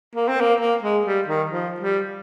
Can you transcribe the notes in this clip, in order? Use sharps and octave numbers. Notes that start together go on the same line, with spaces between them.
A#3
C4
A#3
A#3
G#3
G3
D#3
F3
G3